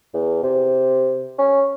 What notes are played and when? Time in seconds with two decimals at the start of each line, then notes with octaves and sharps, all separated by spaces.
0.14 E2
0.43 C3
1.38 C#4